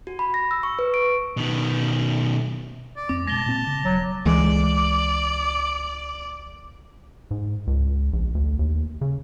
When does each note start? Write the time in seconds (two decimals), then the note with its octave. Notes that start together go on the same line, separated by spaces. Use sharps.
0.07 F#4
0.19 B5
0.34 A#6
0.51 E6
0.63 C#6
0.79 B4
0.94 D7
1.37 B2 D#3
2.96 D5
3.09 F2 C4 D6
3.27 B2 G#3 A5 A#6 G7
3.46 A#2 C4
3.67 C#3
3.85 E1 F#3
4.25 C#2 E3 G#3 D5
7.31 G#2
7.67 C#2
8.13 A#1
8.35 D2
8.59 D#2
9.01 C#3